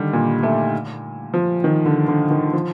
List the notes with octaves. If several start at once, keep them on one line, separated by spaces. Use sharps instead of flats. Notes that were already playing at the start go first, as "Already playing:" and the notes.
Already playing: D3 D#3 G3
A#2
A3
F3
D#3
D3
D3
D#3
F3